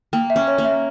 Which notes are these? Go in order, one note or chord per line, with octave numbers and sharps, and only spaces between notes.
A#3 G5
E5
C#4
C#5
A#3
E5